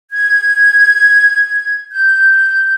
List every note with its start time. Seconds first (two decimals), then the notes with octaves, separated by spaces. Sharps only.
0.12 G#6
1.93 G6